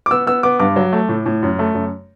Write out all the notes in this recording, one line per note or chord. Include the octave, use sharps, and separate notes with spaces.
D6
B3 E6
B3 E6
B3 D6
G2 D6
F#3
A3
A2
A2
F#2
A3
F#2